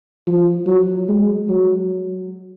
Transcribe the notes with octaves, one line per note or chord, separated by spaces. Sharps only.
F3
F#3
G#3
F#3